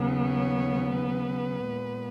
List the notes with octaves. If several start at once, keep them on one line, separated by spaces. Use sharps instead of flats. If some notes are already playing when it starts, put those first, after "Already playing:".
Already playing: D#2 C#3 F#3 B3
C#5
B4
A#2 G#3 B3